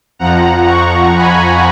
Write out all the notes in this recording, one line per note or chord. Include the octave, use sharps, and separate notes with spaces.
F2 F3 F#5 A#5
A#5 C#6
G#5 B5